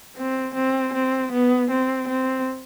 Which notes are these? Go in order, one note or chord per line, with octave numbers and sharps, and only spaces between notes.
C4
C4
C4
B3
C4
C4